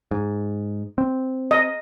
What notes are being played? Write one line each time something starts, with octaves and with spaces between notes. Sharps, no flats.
G#2
C4
D#5